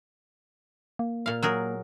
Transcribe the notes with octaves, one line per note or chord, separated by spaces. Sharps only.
A#3
A#2 F5
F#3 G#4 A#4